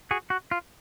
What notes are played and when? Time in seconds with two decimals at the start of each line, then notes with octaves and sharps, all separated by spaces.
0.11 F#4 G#4
0.30 F#4
0.51 F4